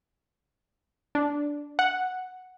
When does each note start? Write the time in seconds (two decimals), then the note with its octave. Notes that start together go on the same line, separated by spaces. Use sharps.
1.15 D4
1.79 F#5